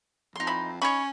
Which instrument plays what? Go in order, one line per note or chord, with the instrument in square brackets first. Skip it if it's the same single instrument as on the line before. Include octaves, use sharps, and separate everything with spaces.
[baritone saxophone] F2 [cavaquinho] D#4 C6
[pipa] E3 E5 B5
[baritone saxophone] C#4 [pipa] D#4 B5 [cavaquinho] C#5 C#6